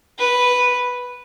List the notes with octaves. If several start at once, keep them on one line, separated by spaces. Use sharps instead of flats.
B4